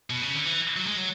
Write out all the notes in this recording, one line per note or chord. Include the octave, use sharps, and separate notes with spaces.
B2
C#3
D3
E3
F#3
G#3
F#3